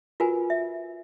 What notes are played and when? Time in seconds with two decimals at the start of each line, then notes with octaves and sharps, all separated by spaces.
0.20 F4 F#4 A#4 B4 G#5
0.50 E5